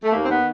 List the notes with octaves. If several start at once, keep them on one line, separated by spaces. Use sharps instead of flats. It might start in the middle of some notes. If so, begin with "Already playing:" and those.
A3
D#2 A#3
C4
D#3 B3